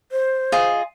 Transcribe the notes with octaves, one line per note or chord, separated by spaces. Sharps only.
C5
F4 G#4 D#5